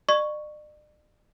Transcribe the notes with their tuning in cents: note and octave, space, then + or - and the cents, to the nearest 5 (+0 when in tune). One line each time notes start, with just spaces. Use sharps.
D5 +45 C#6 +0